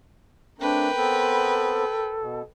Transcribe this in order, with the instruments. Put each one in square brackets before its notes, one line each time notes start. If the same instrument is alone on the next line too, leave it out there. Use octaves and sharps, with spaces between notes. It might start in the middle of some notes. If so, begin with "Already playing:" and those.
[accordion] A3 C4 [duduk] D4 [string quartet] A#4 B4 G5
[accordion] B3 C4 [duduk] A4
[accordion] B2